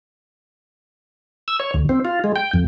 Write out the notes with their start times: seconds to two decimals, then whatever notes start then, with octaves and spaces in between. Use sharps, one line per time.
1.48 E6
1.60 C#5
1.74 D2
1.89 C4
2.05 F4
2.24 G#3
2.36 G5
2.54 F2